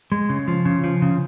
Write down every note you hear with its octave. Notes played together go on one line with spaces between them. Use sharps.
G#3
C#3
F3
C#3
F3
C#3